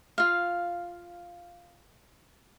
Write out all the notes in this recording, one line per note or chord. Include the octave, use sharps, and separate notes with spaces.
F4 F5